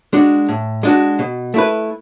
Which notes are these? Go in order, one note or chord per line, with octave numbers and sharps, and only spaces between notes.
G#3 D4 F#4
A2
G#3 D4 F#4
B2
A3 E4 B4